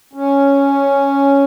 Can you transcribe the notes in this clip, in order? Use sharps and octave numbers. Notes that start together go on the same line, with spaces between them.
C#4